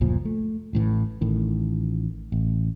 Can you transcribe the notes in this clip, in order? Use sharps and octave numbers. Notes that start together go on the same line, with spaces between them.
F#1 D2 A#2 F3
A3
A1 A2 D#3 E3
A1 A2 D#3
A1